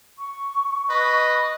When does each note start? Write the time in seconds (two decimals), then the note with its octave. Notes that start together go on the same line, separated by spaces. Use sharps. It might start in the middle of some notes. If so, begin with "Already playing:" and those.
0.18 C#6
0.90 B4 D#5